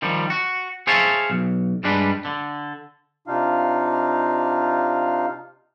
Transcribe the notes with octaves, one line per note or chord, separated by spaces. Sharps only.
D#3 F3 G3
F#4
G#4 C5 C#5 E5 F5 A5
B1
G2 G3 G#3 D4 B4
D3
C3 D4 D#4 F4 F5